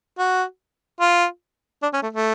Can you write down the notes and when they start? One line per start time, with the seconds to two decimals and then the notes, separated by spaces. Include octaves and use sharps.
0.18 F#4
1.00 F4
1.82 D4
1.93 C#4
2.02 A3
2.13 A3